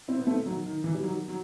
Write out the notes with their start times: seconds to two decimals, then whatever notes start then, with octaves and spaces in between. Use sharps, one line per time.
0.08 C4 E4
0.20 B3
0.27 A3 C4
0.46 D#3 F#3
0.66 D#3
0.84 E3
0.95 G3
1.03 D#3 F#3
1.28 F#3